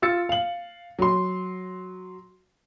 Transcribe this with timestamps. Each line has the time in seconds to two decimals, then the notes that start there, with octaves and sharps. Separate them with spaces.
0.02 F4 E6 A6 C#7
0.29 F5 F#7
0.99 F#3 C6